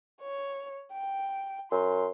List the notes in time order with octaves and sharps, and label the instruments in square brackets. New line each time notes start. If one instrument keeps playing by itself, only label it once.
[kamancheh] C#5
G5
[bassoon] F#2 [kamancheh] C6